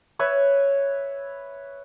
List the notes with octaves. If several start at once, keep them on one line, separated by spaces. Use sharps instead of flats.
B4 C#5 E5